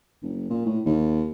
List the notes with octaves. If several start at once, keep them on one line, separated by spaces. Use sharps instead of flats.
F#1
A#2
A2
D#2